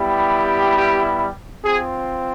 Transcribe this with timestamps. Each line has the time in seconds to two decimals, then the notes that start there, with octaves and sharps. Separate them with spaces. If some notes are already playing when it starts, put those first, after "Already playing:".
Already playing: G3 B3 E4 G4
0.77 G4
1.64 C4 F4 G#4